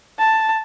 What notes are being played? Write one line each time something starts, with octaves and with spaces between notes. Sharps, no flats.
A5